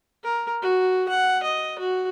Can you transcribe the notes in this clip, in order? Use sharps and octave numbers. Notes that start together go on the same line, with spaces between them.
A#4
F#4
F#5
D#5
F#4